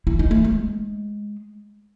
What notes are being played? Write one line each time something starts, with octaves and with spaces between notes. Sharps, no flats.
E4
D#4
A3
G#3